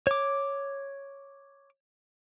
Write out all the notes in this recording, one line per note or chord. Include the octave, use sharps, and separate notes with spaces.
C#5 D6